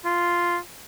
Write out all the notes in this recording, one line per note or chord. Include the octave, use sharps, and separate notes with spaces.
F4